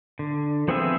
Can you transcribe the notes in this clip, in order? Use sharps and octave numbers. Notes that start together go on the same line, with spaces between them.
D3
F3 B3 C4 G#4 E5